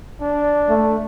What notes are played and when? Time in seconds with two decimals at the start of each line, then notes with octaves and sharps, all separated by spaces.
0.21 D4
0.69 A3